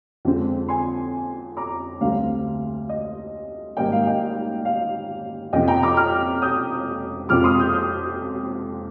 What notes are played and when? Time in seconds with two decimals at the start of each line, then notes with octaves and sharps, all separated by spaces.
0.25 F2 D3 G#3 C4
0.69 G#5 C6
1.57 A#5 D6
2.01 D2 D3 G3 C4 F5
2.89 D#5
3.77 G#1 G#2 G3 A#3 D#5 G5
3.92 F5
4.07 D#5 G5
4.65 F5
5.53 F2 C3 F3 D#5 G5
5.68 G5 A#5
5.83 A#5 D6
5.97 D6 F6
6.42 D#6 G6
7.29 F2 C3 F3 G#3 D6 F6
7.44 C6 D#6
7.59 D#6 G6
7.73 D#6 G6